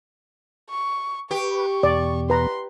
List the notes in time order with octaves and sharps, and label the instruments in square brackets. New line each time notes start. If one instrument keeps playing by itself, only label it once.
[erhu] C#6
[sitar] G4 [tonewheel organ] B4 [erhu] C#6
[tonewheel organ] E2 B2 [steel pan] D5
[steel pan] B4 A#5 [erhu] C6